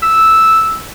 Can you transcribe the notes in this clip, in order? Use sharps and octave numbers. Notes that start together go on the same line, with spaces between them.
E6